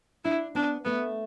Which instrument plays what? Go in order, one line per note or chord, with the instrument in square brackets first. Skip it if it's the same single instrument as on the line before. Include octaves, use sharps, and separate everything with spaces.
[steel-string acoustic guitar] D4 [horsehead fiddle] E4
[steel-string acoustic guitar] B3 [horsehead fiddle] D4
[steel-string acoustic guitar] A3 [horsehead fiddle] B3